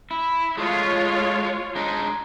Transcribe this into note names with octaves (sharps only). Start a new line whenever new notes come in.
E4
G#3 A3 F4 C#5
G#3 D4 D#4